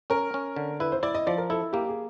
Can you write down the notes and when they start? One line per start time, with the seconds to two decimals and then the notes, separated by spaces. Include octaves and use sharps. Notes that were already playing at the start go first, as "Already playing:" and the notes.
0.10 C#4 A#4
0.34 C#4
0.56 D3
0.80 E4 B4
0.92 C5
1.03 E4 D5
1.15 D#5
1.27 F3 D5
1.38 A#4
1.50 E4 A4
1.73 A#3 G4
1.89 G#4